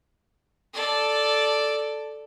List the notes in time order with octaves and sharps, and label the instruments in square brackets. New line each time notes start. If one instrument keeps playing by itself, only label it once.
[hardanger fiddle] A4 D5